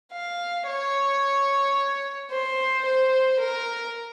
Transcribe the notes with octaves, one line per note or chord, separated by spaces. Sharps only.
F5
C#5
C5
C5
A#4